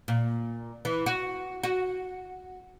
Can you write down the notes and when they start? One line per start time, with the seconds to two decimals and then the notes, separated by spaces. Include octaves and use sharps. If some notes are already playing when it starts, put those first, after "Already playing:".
0.08 A#2
0.85 E3
1.06 F#4
1.63 F#4